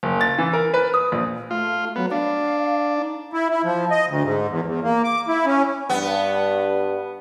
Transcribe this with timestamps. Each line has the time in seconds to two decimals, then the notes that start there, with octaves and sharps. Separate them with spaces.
0.03 F#1
0.21 A6
0.38 E3
0.53 A#4
0.74 B4
0.94 D#6
1.12 A#1
1.51 A3 F4
1.96 F#3 B3
2.11 D4 F5
2.97 D#4
3.33 E4
3.50 E4
3.64 F3
3.91 D#5
4.07 D2
4.23 G#2
4.50 E2
4.65 E2
4.83 A#3
5.04 D6
5.28 E4
5.46 C#4
5.89 G2 B3